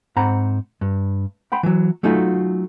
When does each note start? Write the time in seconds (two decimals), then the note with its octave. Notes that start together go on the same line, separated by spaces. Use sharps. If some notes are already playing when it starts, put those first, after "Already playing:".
0.16 G#2 C4 F#5 A#5 B5
0.81 G2
1.52 F#5 G5 B5 C6
1.63 E3 F#3
2.03 F#3 A3 C#4 D#4 F4 F#4